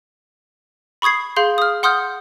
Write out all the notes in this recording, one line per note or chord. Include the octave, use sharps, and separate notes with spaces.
B5 C#6 D#6 G#6 C7
G#4 F5 C6 G6
D#6 F6
F#5 C6 D#6 F6 G6